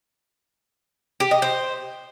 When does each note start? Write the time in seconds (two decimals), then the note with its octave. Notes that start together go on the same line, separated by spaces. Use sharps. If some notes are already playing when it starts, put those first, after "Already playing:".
1.20 G4
1.31 D#5
1.42 C5